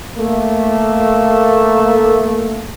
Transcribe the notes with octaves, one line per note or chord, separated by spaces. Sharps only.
A3 A#3